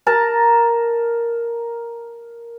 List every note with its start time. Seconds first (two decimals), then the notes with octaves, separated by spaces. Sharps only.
0.07 A#4 A5 A#5